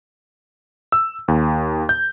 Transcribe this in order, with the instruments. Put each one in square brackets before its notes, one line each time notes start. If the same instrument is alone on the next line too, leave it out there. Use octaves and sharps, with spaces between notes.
[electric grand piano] E6
D#2
G6